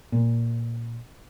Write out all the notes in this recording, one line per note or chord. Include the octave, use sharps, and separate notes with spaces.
A#2